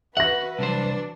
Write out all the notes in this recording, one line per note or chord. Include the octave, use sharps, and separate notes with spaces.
F#4 B4 E5 F#5 A#6
C2 E3 F#3 D4 C5